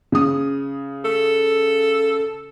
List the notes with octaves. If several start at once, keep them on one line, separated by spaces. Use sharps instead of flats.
C#3 D#6
A4